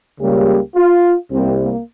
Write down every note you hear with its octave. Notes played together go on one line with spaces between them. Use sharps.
C#2 C#3 G3 A#3 G4
F4
C2 C3 G3 A#3 C4
A#3